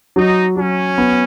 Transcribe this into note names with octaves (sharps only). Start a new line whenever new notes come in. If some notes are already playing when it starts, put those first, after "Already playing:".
F#3 D#4
F#3 C#4
B3